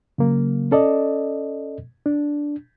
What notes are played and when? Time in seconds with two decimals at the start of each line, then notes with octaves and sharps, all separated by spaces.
0.18 C#3 F#3 A#3
0.72 C#4 A4 D5 D#5
2.06 D4